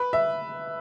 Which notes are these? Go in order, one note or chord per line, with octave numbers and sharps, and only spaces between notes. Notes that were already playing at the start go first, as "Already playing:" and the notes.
Already playing: B4
E5